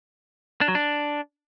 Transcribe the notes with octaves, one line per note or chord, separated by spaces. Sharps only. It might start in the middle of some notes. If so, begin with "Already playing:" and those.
D4
F#3
D4